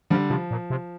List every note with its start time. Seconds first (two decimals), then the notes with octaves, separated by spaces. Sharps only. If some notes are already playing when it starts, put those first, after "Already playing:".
0.10 D3 F3 G3
0.30 C3 F3
0.51 A#2
0.70 C3